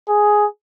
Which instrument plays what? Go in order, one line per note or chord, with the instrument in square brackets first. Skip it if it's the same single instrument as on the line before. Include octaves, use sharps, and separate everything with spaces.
[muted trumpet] G#4